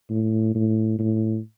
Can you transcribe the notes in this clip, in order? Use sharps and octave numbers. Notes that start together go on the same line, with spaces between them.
A2
A2
A2